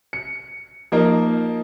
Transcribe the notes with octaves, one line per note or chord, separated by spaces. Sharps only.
C#7
F3 A#3 D#4 A#4